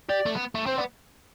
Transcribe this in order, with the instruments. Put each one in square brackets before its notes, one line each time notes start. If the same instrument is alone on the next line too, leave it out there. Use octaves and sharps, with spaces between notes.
[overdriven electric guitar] G4 [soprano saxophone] D5
[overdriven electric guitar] A3
B3
A3
[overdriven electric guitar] C4 [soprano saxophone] C5
[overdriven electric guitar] B3 [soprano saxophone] D5